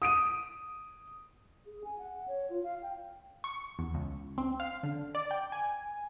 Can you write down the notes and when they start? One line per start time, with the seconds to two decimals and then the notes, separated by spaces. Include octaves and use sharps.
0.02 D#6 D7 D#7
1.65 G#4
1.84 G#5
1.99 F#5
2.28 C#5
2.50 F4
2.64 F5
2.83 G5
3.44 C#6
3.79 E2
3.94 C#2
4.38 C4
4.60 F5
4.83 D3
5.15 D5
5.31 G5
5.52 G#5